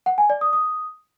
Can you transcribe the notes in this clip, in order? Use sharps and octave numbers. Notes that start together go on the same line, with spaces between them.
F#5
G#5
D5
D#6
D#6